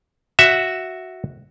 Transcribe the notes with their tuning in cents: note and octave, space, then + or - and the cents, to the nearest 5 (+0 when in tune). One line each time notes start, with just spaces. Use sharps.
F#4 +0 E5 +0